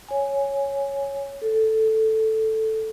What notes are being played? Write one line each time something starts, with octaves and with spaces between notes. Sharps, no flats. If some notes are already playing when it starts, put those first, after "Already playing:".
C#5 G#5
A4